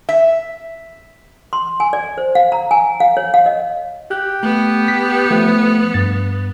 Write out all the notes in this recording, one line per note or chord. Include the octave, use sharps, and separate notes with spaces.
E5
C6
G#5
D5
C5
F5
A#5
G#5
F5
C#5
F5
D#5
G4 F#6
A3 B3
B6
F3 A3
G2 A6